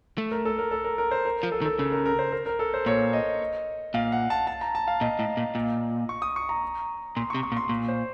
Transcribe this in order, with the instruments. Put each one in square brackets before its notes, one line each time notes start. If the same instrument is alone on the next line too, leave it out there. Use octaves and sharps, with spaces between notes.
[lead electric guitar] A3
[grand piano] A#4
A4
A#4
A4
A#4
A#4
C5
A#4
[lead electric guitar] F3
[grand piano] A4
[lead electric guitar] D#3
[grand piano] A4
[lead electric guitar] C#3 [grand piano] A4
[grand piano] A#4
A#4
C5
A#4
A#4
A4
C5
[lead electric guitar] A#2 [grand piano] C#5
[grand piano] D#5
[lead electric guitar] A#2 [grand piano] F5
[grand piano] F#5
A5
A5
A#5
A5
F5
[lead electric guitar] A#2 [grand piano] D#5
[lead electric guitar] A2
A#2
A#2
[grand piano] C#6
D#6
C#6
A#5
[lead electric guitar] A#2 [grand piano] C6
[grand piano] C#6
[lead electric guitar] C3
[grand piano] C#6
[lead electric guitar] A#2
[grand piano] C6
[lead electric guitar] A#2
[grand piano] C5